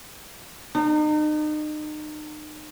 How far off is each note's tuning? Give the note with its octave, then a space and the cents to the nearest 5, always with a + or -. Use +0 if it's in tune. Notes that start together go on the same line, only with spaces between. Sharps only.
D#4 -35